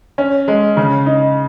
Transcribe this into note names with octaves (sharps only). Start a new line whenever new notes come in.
C#4
G#3
C#3
D#4